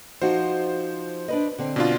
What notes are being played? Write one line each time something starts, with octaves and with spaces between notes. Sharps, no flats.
F3 D#4 F#4 C5
D4 B4 D#5
D3 C4
B2 D4 F4